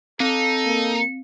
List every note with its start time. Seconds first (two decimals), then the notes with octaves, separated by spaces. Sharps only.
0.20 C4 D#4 A4
0.66 A#3